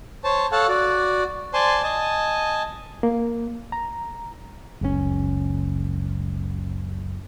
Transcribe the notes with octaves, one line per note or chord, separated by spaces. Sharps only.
C5 C#5 A5
A4 C#5 F5 F#5 A5
F#4 D5
C5 D5 G#5 A5 C6
D#5 G#5 A5
A#3
A#5
F#1 C#2 A#2 C#4